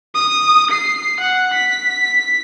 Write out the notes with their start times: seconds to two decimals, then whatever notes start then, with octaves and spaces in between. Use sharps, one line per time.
0.15 D#6
0.71 C7
1.20 F#5
1.53 B6